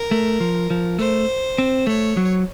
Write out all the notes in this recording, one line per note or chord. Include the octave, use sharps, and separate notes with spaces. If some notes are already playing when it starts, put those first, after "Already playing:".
Already playing: A#4
A3
F3
F3
A3 C5
C4
A3 C#5
F#3